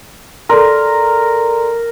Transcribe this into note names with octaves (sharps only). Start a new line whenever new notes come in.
A4 A#4 D5 C6